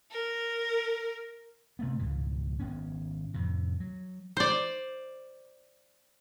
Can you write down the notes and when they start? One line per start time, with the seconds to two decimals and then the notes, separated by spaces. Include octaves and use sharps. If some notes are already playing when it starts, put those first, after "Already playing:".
0.11 A#4
1.79 C3 A3 B3
1.99 C#2 G#2 B2 E3
2.60 G#1 B3 C#4
3.34 F2 A2 C3
3.80 F#3
4.37 C5 D5